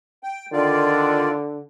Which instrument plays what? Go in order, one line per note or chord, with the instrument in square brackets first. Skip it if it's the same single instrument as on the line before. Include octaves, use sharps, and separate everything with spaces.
[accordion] G5
[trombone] D3 [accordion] D#3 F4 D5